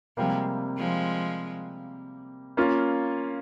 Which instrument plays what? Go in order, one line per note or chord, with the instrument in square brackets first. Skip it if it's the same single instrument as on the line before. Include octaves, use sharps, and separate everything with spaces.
[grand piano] C3 G3 A#3 [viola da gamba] F3 G#3
[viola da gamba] F3 G#3
[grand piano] A#3 C#4 F4